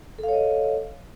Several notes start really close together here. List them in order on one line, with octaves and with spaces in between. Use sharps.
A4 F5 C#5 D#5